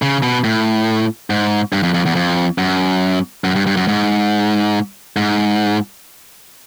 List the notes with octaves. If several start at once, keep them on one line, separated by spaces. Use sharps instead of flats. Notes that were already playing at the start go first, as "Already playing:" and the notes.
C#3
B2
A2
G#2
G2
F2
F2
E2
F2
F#2
F#2
G2
G2
F#2
G#2
G#2